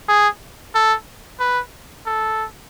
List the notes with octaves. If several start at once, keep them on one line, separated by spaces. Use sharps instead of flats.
G#4
A4
B4
A4